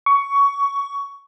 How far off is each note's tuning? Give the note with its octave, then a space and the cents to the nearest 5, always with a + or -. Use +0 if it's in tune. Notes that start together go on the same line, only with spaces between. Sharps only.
C#6 +15